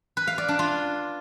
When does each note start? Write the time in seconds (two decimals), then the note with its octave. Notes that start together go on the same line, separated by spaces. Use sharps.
0.17 B4
0.27 F5
0.38 D5
0.48 D4
0.59 F4